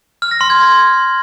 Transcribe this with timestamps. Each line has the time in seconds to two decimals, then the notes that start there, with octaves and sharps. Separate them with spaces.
0.22 F6
0.31 A#6
0.41 C6
0.50 G#6